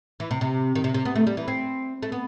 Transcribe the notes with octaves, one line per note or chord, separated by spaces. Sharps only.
E3
C3
C3
D#3
C3
C3
B3
A3
G3
E3
C4
A3
B3